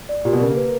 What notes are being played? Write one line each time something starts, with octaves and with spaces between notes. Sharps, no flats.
D5
A#2 G4
B2
C#3 A#4
A#3
B4